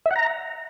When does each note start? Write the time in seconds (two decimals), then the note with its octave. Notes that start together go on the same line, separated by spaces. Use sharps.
0.06 E5
0.11 F#5
0.16 A#5